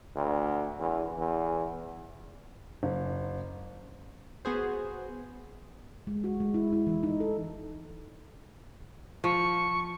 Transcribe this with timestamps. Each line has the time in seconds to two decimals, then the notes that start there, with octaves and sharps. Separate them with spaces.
0.16 D2
0.80 E2
1.18 E2
2.83 F#1
4.45 B3 F#4 G#4 C5
6.07 G#3
6.24 F#4
6.40 G#3
6.54 E4
6.73 E4
6.87 E3
7.03 D#4
7.20 A4
9.24 F3 C#6